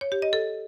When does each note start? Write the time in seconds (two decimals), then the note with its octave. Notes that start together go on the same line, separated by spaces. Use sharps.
0.01 C#5
0.12 G4
0.22 D#5
0.33 A4